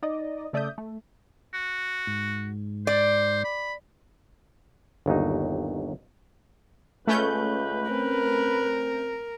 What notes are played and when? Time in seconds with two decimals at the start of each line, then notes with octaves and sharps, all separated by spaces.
0.03 D#4 D5 D#5
0.53 C#3 A3 D5 E5 D#6 G6
0.78 A3
1.54 F#4
2.07 G#2
2.87 C5 D5
3.44 B5
5.06 G1 D#2 F#3 D#4
7.07 C#2 A3 C#4 B4 G6
7.90 C4 A#4